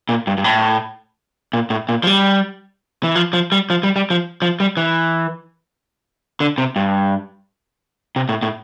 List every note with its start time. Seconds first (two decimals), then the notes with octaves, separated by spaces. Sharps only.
0.09 A#2
0.27 G2
0.38 G2
0.44 A2
1.53 A#2
1.70 A2
1.89 A#2
2.03 F3
2.07 G3
3.03 E3
3.15 F3
3.33 F3
3.52 G3
3.70 F3
3.83 G3
3.96 G3
4.10 F3
4.42 F3
4.60 G3
4.77 E3
6.40 D3
6.58 C3
6.76 G2
8.16 C3
8.29 A2
8.43 A2